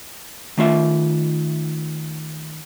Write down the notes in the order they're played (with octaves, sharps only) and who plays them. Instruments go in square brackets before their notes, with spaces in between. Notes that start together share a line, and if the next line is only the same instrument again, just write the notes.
[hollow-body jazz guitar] D#3 A3 F4 E5